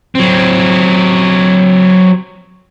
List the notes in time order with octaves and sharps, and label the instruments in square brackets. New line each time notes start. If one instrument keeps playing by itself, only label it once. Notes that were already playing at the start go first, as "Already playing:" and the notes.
[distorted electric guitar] F#3 C4